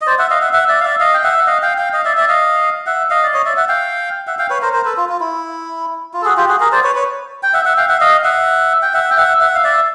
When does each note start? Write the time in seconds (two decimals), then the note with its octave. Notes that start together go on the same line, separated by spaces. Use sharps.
0.01 D#5
0.07 C5 D5
0.18 E5 F#5
0.30 D#5 F5
0.41 E5 F#5
0.53 E5 F#5
0.69 D5 E5
0.81 F5
0.85 D5 E5
1.00 D#5 F5
1.14 G5
1.23 E5 F#5
1.38 F#5
1.47 D#5 F5
1.62 F5 G5
1.78 F5 G5
1.93 D#5 F5
2.05 D5 E5
2.17 D5 E5
2.28 D#5 F5
2.86 E5 F#5
3.10 D#5 F5
3.23 D5
3.34 C#5 D#5
3.46 D5 E5
3.57 E5 F#5
3.69 F5 G5
4.27 E5 F#5
4.39 F5 G5
4.50 B4 C#5
4.62 A#4 C5
4.73 A#4 C5
4.85 A4 B4
4.97 F4
5.09 F4
5.20 E4
6.14 F4
6.22 A4
6.25 F#4 G#4
6.37 F4 G4
6.49 F#4 G#4
6.60 G#4 A#4
6.72 C5 D5
6.84 B4 C#5
6.95 B4 C#5
7.43 G5
7.53 E5 F#5
7.65 E5 F#5
7.77 F5 G5
7.89 E5 F#5
8.00 D#5 F5
8.24 E5 F#5
8.82 G5
8.94 E5 F#5
9.11 G5
9.17 E5 F#5
9.40 E5 F#5
9.55 F5
9.64 D5 E5